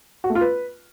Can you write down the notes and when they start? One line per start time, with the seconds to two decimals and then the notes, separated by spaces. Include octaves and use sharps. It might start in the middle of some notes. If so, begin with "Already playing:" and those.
0.24 F#4
0.30 A3
0.35 F4
0.41 B4